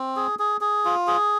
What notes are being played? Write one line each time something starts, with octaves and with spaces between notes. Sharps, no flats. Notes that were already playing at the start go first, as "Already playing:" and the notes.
Already playing: C4
G#4
G#4
G#4
F4
G#4